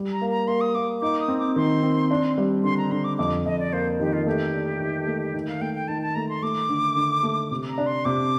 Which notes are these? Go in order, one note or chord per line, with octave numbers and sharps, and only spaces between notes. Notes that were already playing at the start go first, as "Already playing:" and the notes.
Already playing: G3
A#5
A#3
A#5
A#3 C6
D#6
A#3 D6
D#4 D6
D#6
C4
D6
D#3 C6
C4
D4
G3
D3 C6
A#5
D3 C6
D6
F2 D6
F2 D#5
D5
A#3 C5
D#3 G4
F4
A3 G4
D4
D#3
A3
D#3
F5
A3 G5
G5
D#3 A5
A5
A3 A#5
C6
A3 D6
D3
D3
A3
C3
A#5
D4
C6
C3 D6